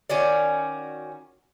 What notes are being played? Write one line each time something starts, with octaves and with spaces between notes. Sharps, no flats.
D#3 C#4 F#4 D5